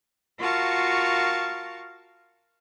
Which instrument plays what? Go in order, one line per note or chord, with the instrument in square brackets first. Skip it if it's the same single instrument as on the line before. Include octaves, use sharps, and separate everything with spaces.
[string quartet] F4 F#4 A#4 F5 A5 C#6